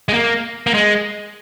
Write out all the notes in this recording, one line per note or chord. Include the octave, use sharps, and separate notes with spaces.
G#3
A#3
A#3
G#3